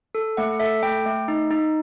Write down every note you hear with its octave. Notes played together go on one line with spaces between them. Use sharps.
A4
A3 F#5
A4 E5
A3 G5
A3
D#4
D#4